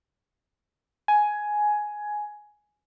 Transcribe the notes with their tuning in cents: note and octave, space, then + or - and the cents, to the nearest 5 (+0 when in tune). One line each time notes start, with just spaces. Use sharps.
G#5 +10